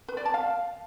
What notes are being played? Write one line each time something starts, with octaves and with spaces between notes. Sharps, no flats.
B4
D5
A5
F5